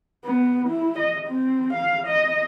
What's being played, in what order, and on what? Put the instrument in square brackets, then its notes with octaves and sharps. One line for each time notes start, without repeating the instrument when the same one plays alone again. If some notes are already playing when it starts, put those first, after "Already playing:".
[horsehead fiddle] B3
E4
D#5
C4
F5
D#5